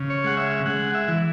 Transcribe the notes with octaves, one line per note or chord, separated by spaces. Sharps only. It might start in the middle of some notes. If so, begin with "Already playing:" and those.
Already playing: C#3
C#5
G#3 F#5
E5
G#3 F#5
E5
E3